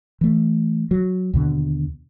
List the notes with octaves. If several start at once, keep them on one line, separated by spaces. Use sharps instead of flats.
E3 A3
F#3
D#2 B2 D3